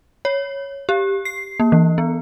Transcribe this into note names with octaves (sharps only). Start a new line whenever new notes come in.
C#5
G4
C7
A#3
E3
B3